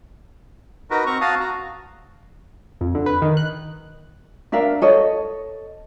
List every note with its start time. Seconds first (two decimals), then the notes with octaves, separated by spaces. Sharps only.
0.91 D#4 F#4 A#4 B4
1.06 C4 A#5 C#6
1.21 F#4 F5 A5 D#6
1.40 F#4 A#5
2.81 F2
2.95 D3
3.06 B4
3.22 D#3
3.37 F#6
4.52 D4 A#4 E5 F5
4.82 A4 C#5 D#5